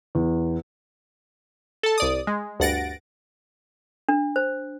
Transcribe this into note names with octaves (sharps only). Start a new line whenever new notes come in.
E2
A4 A5
C2 D5 D#6
G#3
D2 G2 F#5 A6 A#6 D7
D4
C5